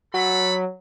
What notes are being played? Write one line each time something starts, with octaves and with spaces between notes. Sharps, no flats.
F#3 A4 B5